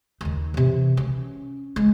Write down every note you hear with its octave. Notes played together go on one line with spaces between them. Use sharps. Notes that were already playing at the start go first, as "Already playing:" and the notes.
D#2 D#4
C3 E3
C#4
G#3